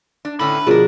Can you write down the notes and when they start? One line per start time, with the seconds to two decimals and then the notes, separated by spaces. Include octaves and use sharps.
0.25 D4
0.40 A2 D3 C#4 B4 B5
0.67 B2 F3 D4 G#4 A#4